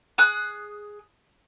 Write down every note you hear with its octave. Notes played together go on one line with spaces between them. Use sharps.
G#4 D#6 F#6